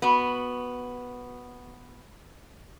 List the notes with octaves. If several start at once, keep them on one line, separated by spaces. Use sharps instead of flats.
B3 F#4